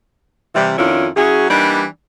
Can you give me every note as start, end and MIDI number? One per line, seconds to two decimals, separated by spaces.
0.55 0.76 48
0.55 0.76 52
0.55 0.76 55
0.78 1.08 41
0.78 1.08 51
0.78 1.08 61
0.78 1.08 62
0.78 1.08 64
0.78 1.08 65
1.16 1.47 54
1.16 1.47 61
1.16 1.47 64
1.16 1.47 66
1.16 1.47 68
1.49 1.84 52
1.49 1.84 55
1.49 1.84 58
1.49 1.84 62
1.49 1.84 63
1.49 1.84 74